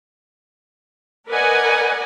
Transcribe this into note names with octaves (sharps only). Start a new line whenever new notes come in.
A#4 B4 D5 D#5 F#5 G#5